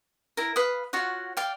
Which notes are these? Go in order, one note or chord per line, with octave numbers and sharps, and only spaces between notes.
E4 A#4
B4 F5 B5 D#6
F4 F#4 C#5 F#5
D5 F5 G5